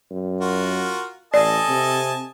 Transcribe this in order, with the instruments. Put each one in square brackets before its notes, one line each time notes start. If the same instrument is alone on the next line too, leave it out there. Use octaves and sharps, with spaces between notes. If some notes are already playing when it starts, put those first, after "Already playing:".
[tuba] F#2
[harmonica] F4 F#4 A#4
[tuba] A1 [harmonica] A4 G#5 A5 [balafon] D5 [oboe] D#5
[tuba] C3